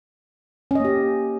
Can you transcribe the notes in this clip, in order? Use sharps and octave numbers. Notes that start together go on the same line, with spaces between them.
A#3 C#4 G4 D#5